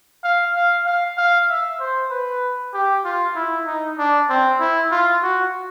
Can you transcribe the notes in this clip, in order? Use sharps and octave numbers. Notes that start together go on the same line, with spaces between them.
F5
F5
F5
F5
E5
C5
B4
G4
F4
E4
D#4
D4
C4
E4
F4
F#4